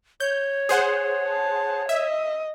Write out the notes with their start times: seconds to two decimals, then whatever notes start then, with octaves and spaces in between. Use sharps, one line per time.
0.20 C#5 G6
0.69 G#4 C5 F#5
1.29 A5
1.89 D#5 E5